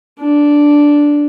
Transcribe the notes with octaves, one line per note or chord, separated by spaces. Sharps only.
D4